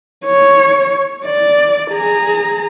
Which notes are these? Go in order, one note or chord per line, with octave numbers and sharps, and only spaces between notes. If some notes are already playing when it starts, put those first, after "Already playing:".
C#5
D5
G#4 A#5